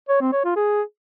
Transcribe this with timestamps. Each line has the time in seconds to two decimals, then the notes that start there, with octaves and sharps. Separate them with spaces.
0.09 C#5
0.21 C4
0.33 C#5
0.44 F4
0.56 G#4